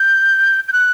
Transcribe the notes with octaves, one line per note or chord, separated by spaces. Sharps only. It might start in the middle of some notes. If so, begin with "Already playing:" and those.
Already playing: G6
G6
F#6